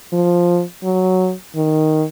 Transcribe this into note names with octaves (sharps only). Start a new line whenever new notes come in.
F3
F#3
D#3